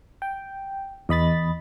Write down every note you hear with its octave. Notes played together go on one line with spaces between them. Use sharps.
G5
E2 D#5 B5 A6